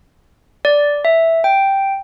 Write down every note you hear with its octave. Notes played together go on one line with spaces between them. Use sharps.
D5
E5
G5